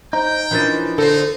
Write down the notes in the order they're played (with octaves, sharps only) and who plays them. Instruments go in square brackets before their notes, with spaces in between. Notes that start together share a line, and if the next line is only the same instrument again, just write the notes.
[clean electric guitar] D#4 [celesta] C5 A#5 [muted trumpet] G5
[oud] E3 F3 C#4 [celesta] D4 A#4 A6
[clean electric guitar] D3 [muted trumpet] D#4 [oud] A4 C5